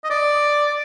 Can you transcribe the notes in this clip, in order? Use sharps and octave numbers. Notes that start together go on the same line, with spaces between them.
D#5
D5